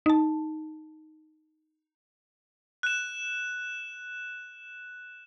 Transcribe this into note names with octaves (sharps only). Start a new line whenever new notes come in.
D#4 A5
F#6 E7